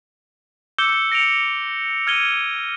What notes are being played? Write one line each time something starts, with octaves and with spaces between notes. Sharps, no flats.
D6 E6 G6 C#7 G7
G6 A#6 C#7 D7 F7
F6 G#6 D#7 G7